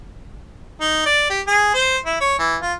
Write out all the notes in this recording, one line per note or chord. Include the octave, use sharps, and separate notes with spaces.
D#4
D5
G4
G#4
C5
E4
C#5
E3
F4